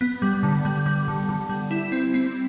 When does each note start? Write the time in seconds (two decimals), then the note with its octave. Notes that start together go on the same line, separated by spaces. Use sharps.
0.01 B3
0.22 G3
0.43 D3
0.65 G3
0.86 G3
1.08 D3
1.29 D3
1.49 G3
1.71 E4
1.92 C4
2.14 C4